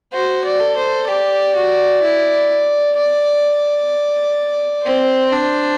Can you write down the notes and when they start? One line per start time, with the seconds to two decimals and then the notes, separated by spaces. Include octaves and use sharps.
0.13 F#4 C5
0.44 D5
0.60 A4
0.76 C5
1.08 G4 D5
1.55 F#4
2.02 E4
2.97 D5
4.85 C4 C5
5.32 D4